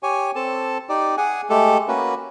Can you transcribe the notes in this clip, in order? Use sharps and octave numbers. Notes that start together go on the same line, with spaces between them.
G4 C#5 G#5
C4 A4 A5
D#4 G4 D5
G#4 F#5 G#5
G#3 A3 G4 A4
A#3 C#4 F#4 B4